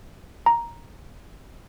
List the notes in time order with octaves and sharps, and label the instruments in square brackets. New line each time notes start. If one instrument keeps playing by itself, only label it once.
[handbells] A#5